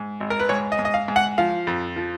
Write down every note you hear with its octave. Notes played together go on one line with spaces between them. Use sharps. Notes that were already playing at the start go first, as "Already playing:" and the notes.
Already playing: G#2
G#1
A#4
B4
G#2 C#5
D#5
G#2
D#5
F5
G#2
F#5
F3 F5
F2
F3